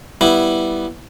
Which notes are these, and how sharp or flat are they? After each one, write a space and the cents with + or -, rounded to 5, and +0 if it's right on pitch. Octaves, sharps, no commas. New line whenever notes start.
G3 +0 B3 +0 E4 +0